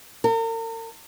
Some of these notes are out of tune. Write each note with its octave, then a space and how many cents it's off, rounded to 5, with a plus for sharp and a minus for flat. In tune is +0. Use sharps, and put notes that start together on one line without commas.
A#4 -45